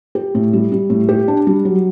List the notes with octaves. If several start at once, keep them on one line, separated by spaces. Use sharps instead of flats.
G4
A2
G3
G3
A2
G4
D4
G3
F#3